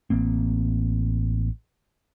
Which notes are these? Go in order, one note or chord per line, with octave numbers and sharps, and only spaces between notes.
A1 A#3 C4